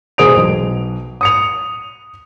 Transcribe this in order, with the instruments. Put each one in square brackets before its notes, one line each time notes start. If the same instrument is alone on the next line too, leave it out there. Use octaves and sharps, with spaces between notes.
[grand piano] E1 G#4 C5 D#6 D7 F7
B1
D#6 C#7 F7